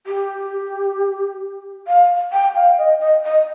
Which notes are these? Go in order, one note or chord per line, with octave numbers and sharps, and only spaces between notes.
G4
F5
G5
F5
D#5
D#5
D#5